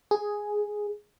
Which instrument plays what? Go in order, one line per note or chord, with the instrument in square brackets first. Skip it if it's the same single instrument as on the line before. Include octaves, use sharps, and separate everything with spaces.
[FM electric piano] G#4